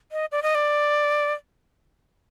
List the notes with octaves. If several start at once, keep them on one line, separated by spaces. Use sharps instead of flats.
D#5
D5
D#5
D5